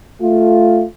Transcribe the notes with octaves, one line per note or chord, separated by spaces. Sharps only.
A3 F4